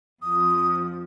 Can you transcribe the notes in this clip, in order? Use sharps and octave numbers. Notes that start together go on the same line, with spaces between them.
F2 F3 D#6